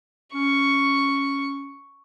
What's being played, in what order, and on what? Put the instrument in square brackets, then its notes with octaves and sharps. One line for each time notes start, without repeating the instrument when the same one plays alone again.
[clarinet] C#4 [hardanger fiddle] C#6